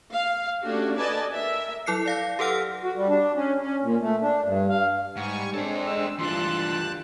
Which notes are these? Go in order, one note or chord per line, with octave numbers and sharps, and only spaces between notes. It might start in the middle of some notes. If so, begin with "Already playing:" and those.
F5
A3 C#4 D4 F#4 G4
A4 B4 D5 D#5 G#5 A5
A#4 E5
F#3 E4 A4 F#6 C7 C#7
D5 F5 A#6
G4 A4 B4 F#5 F6 A#6
F#4
G3
D4
C#4
C#4
A#2
A3
D4
G2
F5
G#2 G3 F#5 G#5 C#6
G#3 C4 D4 A4 C5 C#5
E6
D2 G2 E3 D4 F4 A5 C6 F#6
G4